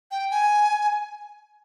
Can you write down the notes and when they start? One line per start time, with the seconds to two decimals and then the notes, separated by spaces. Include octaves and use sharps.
0.11 G5
0.31 G#5